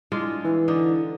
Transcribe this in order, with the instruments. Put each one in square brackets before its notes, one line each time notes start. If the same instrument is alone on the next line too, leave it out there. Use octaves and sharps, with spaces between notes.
[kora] G#3 D4 F4 [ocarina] E4
[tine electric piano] E3 [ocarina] E4
[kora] D3 D4 D#4